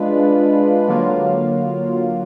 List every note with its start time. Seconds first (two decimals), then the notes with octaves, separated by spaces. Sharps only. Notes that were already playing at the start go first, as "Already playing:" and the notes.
Already playing: G#3 D4 F4 B4
0.88 D3 F#3 A#3 F4